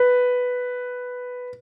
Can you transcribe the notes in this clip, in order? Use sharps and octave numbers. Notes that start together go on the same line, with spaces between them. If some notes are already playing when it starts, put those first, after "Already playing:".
Already playing: B4